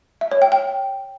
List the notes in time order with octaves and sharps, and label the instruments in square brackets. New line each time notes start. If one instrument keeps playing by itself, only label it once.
[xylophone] E5
C#5
G5
G5